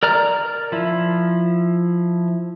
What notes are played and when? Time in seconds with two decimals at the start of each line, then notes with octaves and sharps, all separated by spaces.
0.03 A#4 D5 A#5 F6
0.72 F3 E4